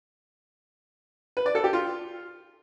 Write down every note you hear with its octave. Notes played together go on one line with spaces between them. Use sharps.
B4
D5
A4
G4
F4